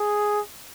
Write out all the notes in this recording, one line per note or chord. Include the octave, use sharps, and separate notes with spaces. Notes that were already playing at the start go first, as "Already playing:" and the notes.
Already playing: G#4